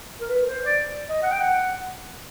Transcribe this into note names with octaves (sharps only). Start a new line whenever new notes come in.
A#4
B4
C5
D5
D#5
F#5
G5
F#5